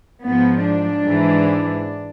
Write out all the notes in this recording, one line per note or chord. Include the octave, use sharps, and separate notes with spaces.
G#2 F3 B3
D4
G#2 E3